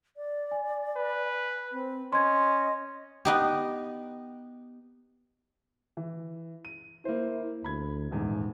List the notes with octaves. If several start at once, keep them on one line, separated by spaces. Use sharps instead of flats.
D5
G#5
B4
C4
C#4 D#5 C6 G#6
B3 D#4 G4
E3
D#7
A#3 E4 C5
D2 B5 G#6
D#1 E2 G#2